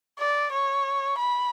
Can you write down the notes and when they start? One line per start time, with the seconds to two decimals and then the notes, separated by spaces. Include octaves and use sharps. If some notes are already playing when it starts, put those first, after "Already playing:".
0.19 D5
0.52 C#5
1.19 B5